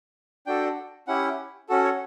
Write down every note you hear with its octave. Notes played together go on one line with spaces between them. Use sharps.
D4 F#4 A4 G5
C#4 E4 G4 F#5
C#4 F#4 A4
C#5